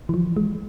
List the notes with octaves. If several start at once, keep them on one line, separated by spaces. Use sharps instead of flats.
E3
F3
G#3